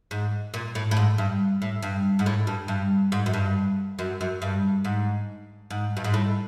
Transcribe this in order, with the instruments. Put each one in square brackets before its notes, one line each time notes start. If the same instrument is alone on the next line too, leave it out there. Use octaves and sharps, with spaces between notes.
[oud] G#2
A#2
A2
A2
G#2
G2
A2
G2
G#2
A2
G2
G2
G#2
F#2
G2
F#2
F#2
G2
G#2
G#2
G2
G#2
A2